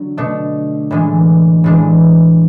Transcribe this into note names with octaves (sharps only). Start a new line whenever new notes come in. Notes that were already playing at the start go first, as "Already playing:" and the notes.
Already playing: D3 F#3
B2 A3 D4
A2 E3 G#3 D4
A2 E3 G#3 D4